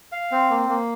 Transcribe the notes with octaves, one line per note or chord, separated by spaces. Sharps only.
F5
C4
A#3
A#3